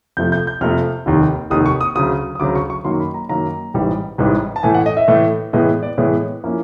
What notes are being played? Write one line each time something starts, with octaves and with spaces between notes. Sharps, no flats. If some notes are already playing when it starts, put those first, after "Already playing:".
F2 C3 F3 A3 G6
G6
G6
F2 C3 F3 A3 F6
F1 D#2 D#3
F1 D#2 D#3 D#6
C#6
D#6
D2 C#3 F#3 D#6
D#6
D2 C#3 F#3 D6
C#6
C#6
F#2 D#3 F#3 A#3 C6
B5
A#5
F#2 D#3 F#3 A#3 A#5
A1 G#2 E3 G3
A1 G#2 E3 G3
A5
A2 E3 A3 G#5
F#5
D#5
E5
A2 E3 A3
A2 E3 G#3 B3 D#5
D5
A2 E3 G#3 B3 C#5
F3 A#3 C#4 E4